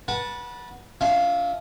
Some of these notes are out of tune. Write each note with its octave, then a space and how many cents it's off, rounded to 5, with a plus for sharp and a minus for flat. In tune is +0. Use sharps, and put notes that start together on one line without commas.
B4 -30 F#5 +0 A5 +0
D4 -45 F4 +0 E5 -15